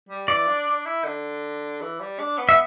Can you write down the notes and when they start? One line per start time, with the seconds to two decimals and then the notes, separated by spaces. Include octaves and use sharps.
0.09 G3
0.28 E3 D5
0.47 D4
0.66 D4
0.85 E4
1.05 D3
1.81 E3
2.00 G3
2.19 D4
2.38 B3
2.49 E5